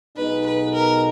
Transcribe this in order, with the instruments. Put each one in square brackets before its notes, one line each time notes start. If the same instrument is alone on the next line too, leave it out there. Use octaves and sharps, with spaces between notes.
[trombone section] B1 B2 G#3 B3 D#4 [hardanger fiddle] B4
[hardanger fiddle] B4
A#4